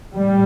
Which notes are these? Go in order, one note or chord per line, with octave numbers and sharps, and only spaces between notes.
A2 G3